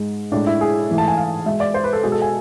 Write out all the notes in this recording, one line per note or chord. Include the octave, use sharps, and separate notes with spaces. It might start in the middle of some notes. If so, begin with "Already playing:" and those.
Already playing: G#2 G#3
A2 G#3 D4
E4
G#4
G#2 E3 A3
A5
G#5
F5
B2 G#3 E5
D5
C5
B4
A4
B2 G#3 G#4
A4
G#5